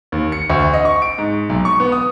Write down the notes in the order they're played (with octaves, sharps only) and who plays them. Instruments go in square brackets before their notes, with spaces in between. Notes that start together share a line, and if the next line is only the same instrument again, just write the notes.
[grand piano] D#2
C#7
D2
D#5
C#6
D7
G#2
B1
C#6
B3
D#6